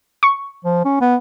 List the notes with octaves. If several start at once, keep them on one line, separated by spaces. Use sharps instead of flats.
C#6
F3
C#4
B3